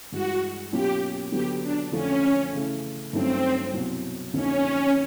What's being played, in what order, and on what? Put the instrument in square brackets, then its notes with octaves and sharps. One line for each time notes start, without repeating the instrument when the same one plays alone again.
[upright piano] G2 E3 G#3 [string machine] F#4
[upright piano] B2 F#3 A#3 C#4 F4 [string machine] G4
[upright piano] D3 F#3 B3 [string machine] G4
[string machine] D4
[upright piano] F2 D3 F3 A3 [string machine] C#4
[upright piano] C#3 E3 A3
[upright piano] G2 D#3 F#3 A3 C#4 [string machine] C4
[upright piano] C2 B2 F#3
[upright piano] F2 D3 F3 A#3 D#4 [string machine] C#4